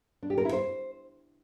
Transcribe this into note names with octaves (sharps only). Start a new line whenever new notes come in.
D4
G4
A#4
E4
C5